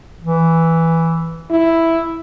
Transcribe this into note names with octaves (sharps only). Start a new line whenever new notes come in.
E3
E4